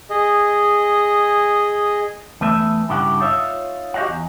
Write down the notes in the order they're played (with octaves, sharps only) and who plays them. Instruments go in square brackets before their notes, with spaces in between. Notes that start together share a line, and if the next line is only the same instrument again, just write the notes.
[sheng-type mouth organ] G#4 D#5
[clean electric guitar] E2 A3 B4 E5
G2 C#3 E4 G4 A4 F#5
D#4 F4 C#5 E5
F#4 G4 D#5 F5 F#5
E2